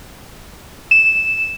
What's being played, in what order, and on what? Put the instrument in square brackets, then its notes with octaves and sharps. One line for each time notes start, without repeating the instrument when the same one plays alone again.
[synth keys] E7